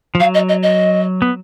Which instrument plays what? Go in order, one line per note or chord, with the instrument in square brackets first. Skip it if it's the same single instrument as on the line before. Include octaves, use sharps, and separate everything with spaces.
[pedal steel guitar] F3
[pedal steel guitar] F#3 [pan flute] F5
[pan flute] D#5
D#5
D#5
[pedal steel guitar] B3